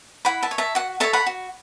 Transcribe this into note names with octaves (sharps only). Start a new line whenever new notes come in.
E4 F#5 B5
E5 A5
C#5
E5 A5
F#4 F#5
A4 C#5 E5 A5
F#5 B5
F#4